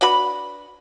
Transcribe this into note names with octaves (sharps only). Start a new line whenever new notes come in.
D4 F#4 B4 B5